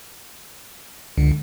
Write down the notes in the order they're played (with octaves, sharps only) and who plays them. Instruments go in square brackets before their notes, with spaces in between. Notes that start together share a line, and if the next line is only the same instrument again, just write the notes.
[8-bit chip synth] C#2 [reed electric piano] D3